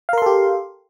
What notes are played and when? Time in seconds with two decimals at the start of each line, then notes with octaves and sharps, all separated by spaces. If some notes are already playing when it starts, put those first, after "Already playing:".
0.09 F5
0.13 A#4
0.18 C6
0.22 A4
0.26 G4